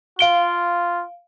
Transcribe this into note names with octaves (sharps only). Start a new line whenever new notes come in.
F4 F5 D7 G7